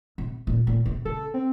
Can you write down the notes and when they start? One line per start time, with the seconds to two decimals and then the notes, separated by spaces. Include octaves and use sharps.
0.18 C3
0.47 A#2
0.67 A#2
0.86 C3
1.05 C#3 A4
1.34 C4